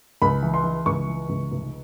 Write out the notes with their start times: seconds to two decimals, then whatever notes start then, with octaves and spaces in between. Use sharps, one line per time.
0.22 C#2 B5
0.43 E3
0.54 C6
0.64 E3
0.86 C#2 C#6
1.07 E3
1.29 C#2
1.51 F1